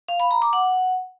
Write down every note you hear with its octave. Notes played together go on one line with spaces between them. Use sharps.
F5
B5
A#5
D6
F#5